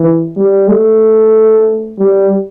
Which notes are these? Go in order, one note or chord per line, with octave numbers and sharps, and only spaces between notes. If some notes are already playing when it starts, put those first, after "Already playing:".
Already playing: E3
G3
A3
G3